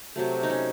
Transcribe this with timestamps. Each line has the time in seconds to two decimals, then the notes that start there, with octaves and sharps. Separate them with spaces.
0.16 C3 F#3 A3
0.43 D#4
0.50 C#4